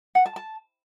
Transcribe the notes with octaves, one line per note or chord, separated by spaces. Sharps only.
F#5
A5
A5